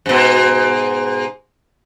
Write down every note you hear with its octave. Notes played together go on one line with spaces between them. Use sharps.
G#2 B2